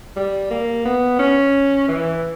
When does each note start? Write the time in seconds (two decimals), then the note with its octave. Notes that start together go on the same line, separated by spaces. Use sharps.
0.17 G3
0.51 A#3
0.85 B3
1.19 C#4
1.88 E3